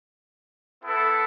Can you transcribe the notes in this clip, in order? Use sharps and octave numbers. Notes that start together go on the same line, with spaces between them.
B3 E4 A4